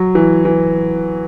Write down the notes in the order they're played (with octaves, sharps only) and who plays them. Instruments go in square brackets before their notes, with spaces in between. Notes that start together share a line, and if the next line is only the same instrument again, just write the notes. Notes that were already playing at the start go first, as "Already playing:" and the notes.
Already playing: [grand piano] F#3
E3
E3